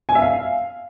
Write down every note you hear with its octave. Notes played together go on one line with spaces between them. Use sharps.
G#5
E5
F5